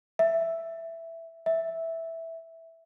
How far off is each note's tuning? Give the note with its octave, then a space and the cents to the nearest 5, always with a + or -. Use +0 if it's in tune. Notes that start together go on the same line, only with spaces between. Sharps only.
E5 +5
E5 -5